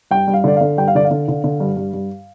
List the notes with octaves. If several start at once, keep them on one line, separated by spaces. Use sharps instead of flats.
G2 G5
G2
F5
D3 D5
D3 F5
G2 G5
F5
D3 D5
F5
D3
D3
D3
G2
G2
G2